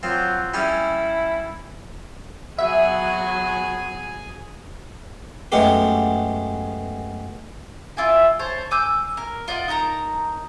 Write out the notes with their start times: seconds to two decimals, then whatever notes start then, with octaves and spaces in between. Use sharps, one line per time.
0.03 F3 F#3 C4
0.54 G3 C#4 E4 G#4
2.58 F#3 B3 G#4 E5 G#5
5.52 F#2 G#3 A3 B3 G4
7.97 E4 F4 D5 G#5
8.39 C5 C#5 A5
8.71 G#5 D6 E6 G6
9.17 A#4
9.48 F4 D5 D#5 F#5
9.68 D#4 A#4 A5 A#5